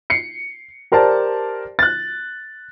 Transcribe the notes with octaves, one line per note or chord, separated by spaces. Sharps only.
C7 C#7
G4 A#4 C5 D5 A5
F#6 A6